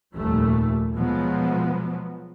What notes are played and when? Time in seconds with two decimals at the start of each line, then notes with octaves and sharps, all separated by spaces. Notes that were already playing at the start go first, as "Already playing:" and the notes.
0.15 F1 D#2 A#2 G3 A3
0.94 B2 F3 F#3 G#3 B3